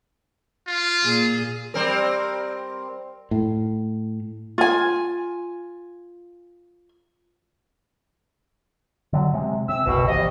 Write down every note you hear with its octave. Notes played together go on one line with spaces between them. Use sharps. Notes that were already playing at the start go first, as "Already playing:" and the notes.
F4
A#2 G#4
G3 C4 A#4
A2
F4 G#5
D3 F#3
C3 G#3
C3 E6
F#1 C2 B2
A#1 E2 C3 D#5